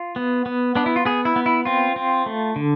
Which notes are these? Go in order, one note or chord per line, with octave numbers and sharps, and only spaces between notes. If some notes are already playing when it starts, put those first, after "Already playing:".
Already playing: F4
B3
B3
B3 D4
E4
F4
B3 G#4
E4
B3
E4
C4 F4
C4
A3
D3